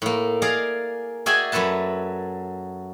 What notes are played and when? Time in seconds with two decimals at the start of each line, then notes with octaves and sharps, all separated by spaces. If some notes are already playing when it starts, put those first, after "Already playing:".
0.02 A2 A#3
0.42 G#4 A#4 D5 F5 A#5
1.26 F#4 G#4 D5 E5 G5 G#5
1.52 F#2 F#4 A4 B4 A5